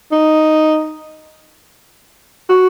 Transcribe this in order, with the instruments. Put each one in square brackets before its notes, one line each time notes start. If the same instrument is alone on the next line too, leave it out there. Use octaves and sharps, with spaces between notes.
[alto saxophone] D#4
F#4